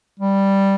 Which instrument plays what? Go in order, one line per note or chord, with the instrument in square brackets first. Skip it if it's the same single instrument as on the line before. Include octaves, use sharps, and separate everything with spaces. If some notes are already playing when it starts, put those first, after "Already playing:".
[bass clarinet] G3